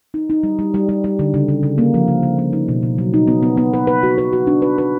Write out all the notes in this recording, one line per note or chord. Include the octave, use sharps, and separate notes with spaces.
D#4
D#4
G3
G3
G3
G3
G3
D3
C#3
C#3
C#3
A#3
F3
C#3
C#3
A#3
D#4
B2
B2
F#3
D#4
B3
B3
B3
B4
B4
F#4
B4
F#4
D4
B4
B4